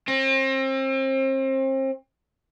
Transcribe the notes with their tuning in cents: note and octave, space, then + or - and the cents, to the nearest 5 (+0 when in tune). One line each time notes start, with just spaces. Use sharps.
C4 +35